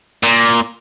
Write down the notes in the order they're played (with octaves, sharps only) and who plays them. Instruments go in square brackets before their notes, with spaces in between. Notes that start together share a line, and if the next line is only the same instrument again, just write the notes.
[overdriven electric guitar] A#2